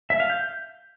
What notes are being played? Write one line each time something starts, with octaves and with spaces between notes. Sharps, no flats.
E5
F5
G6